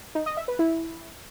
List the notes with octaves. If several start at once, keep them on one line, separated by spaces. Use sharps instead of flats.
D#4
D#5
E5
B4
E4